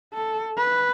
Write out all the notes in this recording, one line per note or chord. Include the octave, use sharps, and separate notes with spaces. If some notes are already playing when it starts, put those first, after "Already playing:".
A4
B4